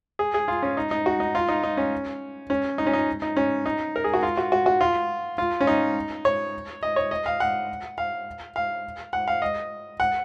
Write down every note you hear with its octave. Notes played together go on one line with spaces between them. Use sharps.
G#4
G#4
F4
C#4
D#4
D#4
F#4
D#4
F4
D#4
D#4
C#4
C#4
D#4
C#4
D#4
D#4
C#4
D#4
A#4
G#4
F#4
F4
F#4
F#4
F#4
F4
F4
C#4
D#4
C#5
D#5
C#5
D#5
F5
F#5
F5
F5
F#5
F5
D#5
F#5